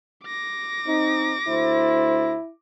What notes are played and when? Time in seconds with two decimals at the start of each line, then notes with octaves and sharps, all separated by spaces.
0.24 D6 A#6
0.86 C4 D#4
1.48 D2 E4 C5